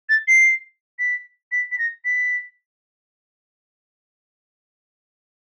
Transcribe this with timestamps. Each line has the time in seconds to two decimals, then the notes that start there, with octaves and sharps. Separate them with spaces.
0.09 A6
0.28 C7
0.99 B6
1.52 B6
1.71 B6
1.78 A#6
2.05 B6